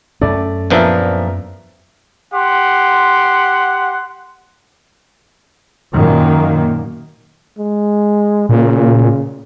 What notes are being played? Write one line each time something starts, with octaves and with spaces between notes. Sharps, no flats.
F#2 A3 C#4 D5
A#1 F3 B3 D4 A#4 E5
G4 F#5 C6
F#2 A#2 D#3 A#3
G#3
A#2 C#3